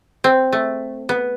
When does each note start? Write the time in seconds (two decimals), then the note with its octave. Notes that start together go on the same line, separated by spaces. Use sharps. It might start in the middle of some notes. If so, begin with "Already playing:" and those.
0.24 C4
0.52 A3
1.09 B3